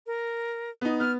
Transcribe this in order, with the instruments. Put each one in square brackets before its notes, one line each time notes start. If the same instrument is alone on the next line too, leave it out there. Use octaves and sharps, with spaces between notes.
[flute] A#4
[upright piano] B3 D#4
[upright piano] B3 [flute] F6